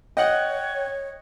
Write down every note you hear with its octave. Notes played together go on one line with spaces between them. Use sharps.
C#5 D#5 F#5 G5 F#6